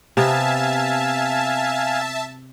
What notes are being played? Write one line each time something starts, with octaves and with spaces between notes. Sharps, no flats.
C3 B3 E5 F5 G#5 A5